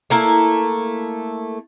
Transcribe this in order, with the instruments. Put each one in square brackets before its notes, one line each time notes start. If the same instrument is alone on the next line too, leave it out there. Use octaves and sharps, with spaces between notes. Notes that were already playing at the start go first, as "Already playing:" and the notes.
[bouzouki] A3 A#3 E4